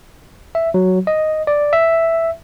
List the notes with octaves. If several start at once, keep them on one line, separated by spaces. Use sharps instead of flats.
E5
F#3
D#5
D5
E5